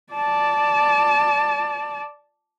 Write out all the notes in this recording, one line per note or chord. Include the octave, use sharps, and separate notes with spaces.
D5 A5